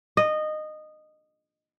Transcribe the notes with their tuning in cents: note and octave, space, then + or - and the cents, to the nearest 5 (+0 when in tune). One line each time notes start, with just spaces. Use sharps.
D#5 -15